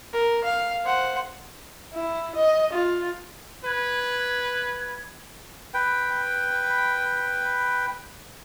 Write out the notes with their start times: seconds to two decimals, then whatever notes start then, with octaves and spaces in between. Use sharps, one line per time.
0.13 A#4
0.44 F5
0.85 C5 F#5
1.94 E4
2.36 D#5
2.73 F4
3.65 B4 G#6
5.74 B4 G5